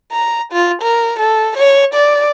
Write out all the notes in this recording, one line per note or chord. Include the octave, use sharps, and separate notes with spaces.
A#5
F4
A#4
A4
C#5
D5